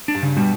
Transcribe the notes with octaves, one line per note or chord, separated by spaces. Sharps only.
D4
G2
C#3
B2 G3